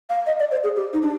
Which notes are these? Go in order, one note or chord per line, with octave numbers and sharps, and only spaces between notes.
F5
D#5
D5
C5
G#4
G4
D#4
D4